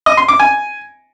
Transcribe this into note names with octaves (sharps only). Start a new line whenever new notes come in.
D#5
C6
D6
G#5